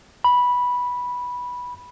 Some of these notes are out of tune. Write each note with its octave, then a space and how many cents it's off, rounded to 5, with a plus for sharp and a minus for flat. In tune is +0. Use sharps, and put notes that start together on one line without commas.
B5 -10